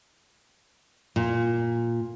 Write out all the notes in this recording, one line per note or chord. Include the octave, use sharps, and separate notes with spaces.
A#2